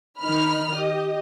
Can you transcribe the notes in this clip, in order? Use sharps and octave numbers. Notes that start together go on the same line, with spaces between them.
D#3 D#4 B5 F6
G4 D#5